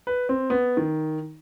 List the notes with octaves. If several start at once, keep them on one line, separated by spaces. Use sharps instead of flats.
B4
C4
B3
D#3